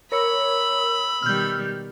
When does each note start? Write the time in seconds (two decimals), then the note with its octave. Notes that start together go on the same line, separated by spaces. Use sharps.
0.12 A#4 C#5 B5 E6
1.22 B2 D#3 G3 F6 G6